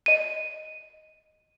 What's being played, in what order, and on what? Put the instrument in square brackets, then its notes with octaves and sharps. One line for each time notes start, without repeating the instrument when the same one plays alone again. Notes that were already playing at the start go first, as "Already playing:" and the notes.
[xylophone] D#5 D#7